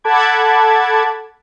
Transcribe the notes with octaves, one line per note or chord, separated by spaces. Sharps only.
A4 F#5 A5 B5 D6 G#6